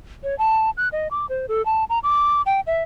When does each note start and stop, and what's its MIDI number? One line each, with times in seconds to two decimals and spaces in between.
0.24 0.37 73
0.39 0.70 81
0.77 0.89 90
0.92 1.08 75
1.11 1.26 86
1.29 1.46 72
1.48 1.64 69
1.66 1.84 81
1.90 1.99 82
2.03 2.42 86
2.46 2.61 79
2.67 2.83 76